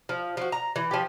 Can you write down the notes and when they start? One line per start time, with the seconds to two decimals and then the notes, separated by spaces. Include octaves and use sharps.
0.09 F3
0.37 F3 F#4
0.52 A#5
0.76 E3
0.91 F3 G4